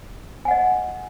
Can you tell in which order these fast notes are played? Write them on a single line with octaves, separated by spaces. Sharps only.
G#5 F#5 D#5